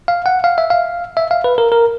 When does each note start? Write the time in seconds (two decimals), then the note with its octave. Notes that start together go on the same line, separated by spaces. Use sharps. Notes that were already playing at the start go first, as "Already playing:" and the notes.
0.08 F5
0.26 F#5
0.44 F5
0.58 E5
0.70 F5
1.17 E5
1.31 F5
1.44 B4
1.58 A#4
1.72 A#4